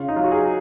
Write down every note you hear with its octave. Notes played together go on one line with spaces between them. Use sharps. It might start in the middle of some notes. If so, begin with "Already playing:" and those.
Already playing: C#3 F4
D#4
F#3 F4
F#4
G#4